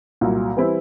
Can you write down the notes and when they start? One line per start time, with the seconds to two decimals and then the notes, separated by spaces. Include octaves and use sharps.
0.21 C2 A#2 F#3
0.57 E3 G3 C4 E4